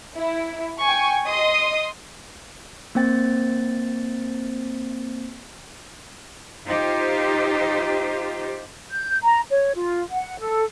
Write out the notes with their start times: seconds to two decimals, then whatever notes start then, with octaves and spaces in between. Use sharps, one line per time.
0.16 E4
0.82 G5 G#5 C#6
1.26 D#5 C6 D#6
2.95 A#3 C4 C5 G5 A6
6.68 D#4 F4 G4 C5
8.91 G6
9.23 A#5
9.50 C#5
9.76 F4
10.11 F#5
10.39 A4